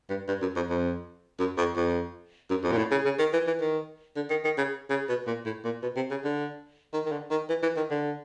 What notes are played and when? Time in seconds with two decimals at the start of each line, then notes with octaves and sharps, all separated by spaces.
0.10 G2
0.28 G2
0.41 F#2
0.56 F2
0.70 F2
1.39 F#2
1.58 F2
1.76 F2
2.50 F#2
2.64 F2
2.72 A#2
2.78 A2
2.91 C#3
3.05 C#3
3.19 D#3
3.33 E3
3.47 E3
3.61 D#3
4.16 D3
4.30 D#3
4.45 D#3
4.58 C#3
4.90 C#3
5.09 B2
5.27 A#2
5.45 A2
5.64 A#2
5.82 B2
5.96 C3
6.11 C#3
6.24 D3
6.93 D#3
7.06 D#3
7.12 D3
7.31 D#3
7.49 E3
7.63 E3
7.77 D#3
7.91 D3